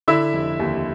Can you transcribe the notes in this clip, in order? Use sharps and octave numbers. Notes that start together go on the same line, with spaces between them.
D3 E4 E5
F1
D#2